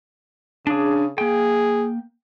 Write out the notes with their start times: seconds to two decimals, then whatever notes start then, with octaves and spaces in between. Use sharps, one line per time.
0.67 C#3 D4 G#4
1.18 A#3 G#4 G5